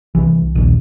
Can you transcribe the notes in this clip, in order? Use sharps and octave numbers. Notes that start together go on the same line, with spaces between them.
C2 E3
A#1 D#2